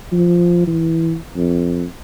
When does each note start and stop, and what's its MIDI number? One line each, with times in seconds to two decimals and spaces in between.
0.12 0.62 53
0.67 1.16 52
1.36 1.84 41